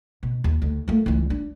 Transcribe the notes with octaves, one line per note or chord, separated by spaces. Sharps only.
B2
D#2
D2
A3 A#3
C#2 E3
D4